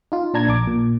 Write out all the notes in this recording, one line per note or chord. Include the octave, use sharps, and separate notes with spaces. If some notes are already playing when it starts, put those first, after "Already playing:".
D#4 F4
A#2 D4 A5 A#5 G#6
A#1 D6
A#2